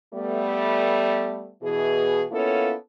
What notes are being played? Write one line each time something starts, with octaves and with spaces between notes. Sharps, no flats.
G3 A3 B3
B2 E3 G#4
A#3 B3 C#4 E4 F4 A4